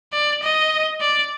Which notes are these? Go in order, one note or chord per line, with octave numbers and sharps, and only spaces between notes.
D5
D#5
D5